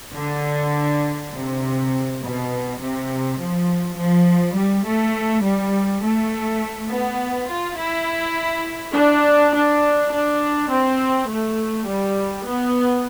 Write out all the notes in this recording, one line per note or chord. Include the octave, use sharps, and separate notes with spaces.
D3
C3
B2
C3
F3
F3
G3
A3
G3
A3
B3
F4
E4
D4
D4
D4
C4
A3
G3
B3